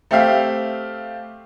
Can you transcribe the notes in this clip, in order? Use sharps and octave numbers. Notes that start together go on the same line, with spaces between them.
A3 C4 G4 E5 F5